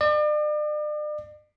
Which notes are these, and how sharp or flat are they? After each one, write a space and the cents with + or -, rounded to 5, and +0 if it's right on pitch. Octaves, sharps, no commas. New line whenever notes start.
D5 +40